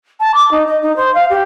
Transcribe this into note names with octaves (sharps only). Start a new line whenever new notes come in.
A5
D6
D#4
D#5
D#4
C5
F5
G4